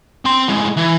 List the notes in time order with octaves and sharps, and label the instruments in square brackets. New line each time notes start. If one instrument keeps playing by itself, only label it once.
[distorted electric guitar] C4 C6
A2 G#3
E3